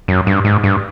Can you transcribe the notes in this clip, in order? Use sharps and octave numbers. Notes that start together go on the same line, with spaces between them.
F#2
G2
G#2
G2